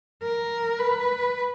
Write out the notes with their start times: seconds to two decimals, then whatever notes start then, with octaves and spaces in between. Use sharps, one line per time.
0.23 A#4
0.79 B4